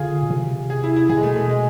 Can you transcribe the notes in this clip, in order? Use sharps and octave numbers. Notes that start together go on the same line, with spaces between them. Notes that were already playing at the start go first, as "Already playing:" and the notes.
Already playing: D3 F4 G#4
B2
C3
G#4
E4
E4
B2 G#4
G#3
A3
A3
G#3